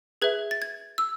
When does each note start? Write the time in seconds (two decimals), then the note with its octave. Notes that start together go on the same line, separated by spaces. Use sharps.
0.22 G#4 B4 E5 G#6
0.51 A6
0.62 G#6
0.98 E6